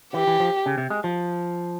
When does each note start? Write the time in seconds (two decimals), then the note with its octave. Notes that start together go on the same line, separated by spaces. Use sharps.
0.14 E3 G4
0.27 E3
0.40 F3
0.66 C#3
0.78 C3
0.90 G#3
1.04 F3